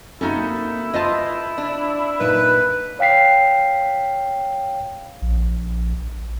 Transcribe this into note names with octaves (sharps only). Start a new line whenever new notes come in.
A#3 C4 C#4 D#4 E4 F#4 A4
F4 B4 C5 D#5 A5
D4
A#2 D#4 B4 E5
C#5 F5 G5 B6 C7
A#1